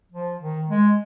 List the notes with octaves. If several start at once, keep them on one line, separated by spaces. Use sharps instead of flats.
F3
D#3
G#3